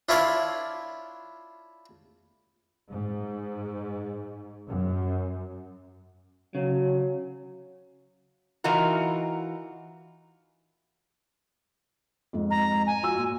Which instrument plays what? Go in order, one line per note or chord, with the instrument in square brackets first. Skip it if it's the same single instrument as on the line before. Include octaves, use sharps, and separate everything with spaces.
[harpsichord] D4 E4 F4 C#5 D5 F5
[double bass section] G#2
F#2
[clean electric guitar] C#3 [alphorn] F#3
[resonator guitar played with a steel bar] E3 D#4 F4 F#4 A#4
[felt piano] F2 G#2
[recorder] A#5
G#5
[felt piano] F4 F#4 E6
A#2